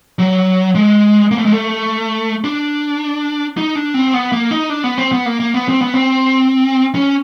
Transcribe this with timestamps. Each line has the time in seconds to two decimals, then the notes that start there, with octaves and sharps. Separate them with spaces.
0.19 F#3
0.75 G#3
1.31 A#3
1.38 A3
1.45 G#3
1.52 A3
2.44 D4
3.57 D#4
3.75 D4
3.94 C4
4.14 B3
4.32 A#3
4.51 D#4
4.70 D4
4.84 B3
4.98 C4
5.12 B3
5.26 A#3
5.40 A#3
5.54 B3
5.68 C4
5.81 B3
5.94 C4
6.95 C#4